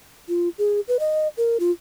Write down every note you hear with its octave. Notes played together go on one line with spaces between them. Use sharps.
F4
G#4
B4
D#5
A#4
F4